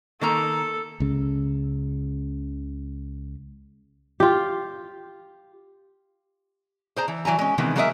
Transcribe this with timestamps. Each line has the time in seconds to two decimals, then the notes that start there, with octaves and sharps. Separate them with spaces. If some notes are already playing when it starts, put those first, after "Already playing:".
0.21 D#3 A#3 A4 A#5
1.00 C#2 C#3
4.20 F4 G4
6.96 G#4 C5 A#5
7.08 E3
7.25 E3 F#3 G#5 A#5
7.39 G#3 C#4
7.58 C3 D#3 E3 G#3 A#3 B3
7.76 F#3 G#3 A#3 A#4 D#5 E5